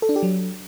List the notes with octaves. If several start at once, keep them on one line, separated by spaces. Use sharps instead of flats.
A4
D4
G4
F#3